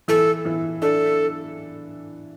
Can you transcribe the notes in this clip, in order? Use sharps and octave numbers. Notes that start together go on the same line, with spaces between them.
E3 A4
E3
D4 A4